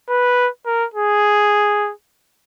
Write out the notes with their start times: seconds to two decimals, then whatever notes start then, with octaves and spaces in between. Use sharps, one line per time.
0.10 B4
0.66 A#4
0.94 G#4